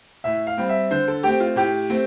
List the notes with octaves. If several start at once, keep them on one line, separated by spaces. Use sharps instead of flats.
A2 E5
F5
G3 C4
E5
D3 C5
A4
A3 C4 G4
F4
A2 G4
A3 C4